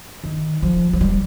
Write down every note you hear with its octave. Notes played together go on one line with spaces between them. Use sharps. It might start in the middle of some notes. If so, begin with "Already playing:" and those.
D#3
F3
F3
G3